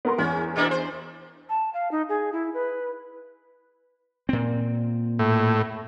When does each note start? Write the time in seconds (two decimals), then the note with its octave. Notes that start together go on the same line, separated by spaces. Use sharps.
0.05 B3 A#4 C6
0.18 E2 C#4
0.56 B2 A#3 D4
0.71 C5
1.49 A5
1.74 F5
1.91 D#4
2.09 G#4
2.33 E4
2.54 B4
4.29 A#2 C4
5.19 A2